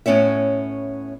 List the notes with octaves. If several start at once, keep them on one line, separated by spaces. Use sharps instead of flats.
A2 B3 C#4 C#5 E5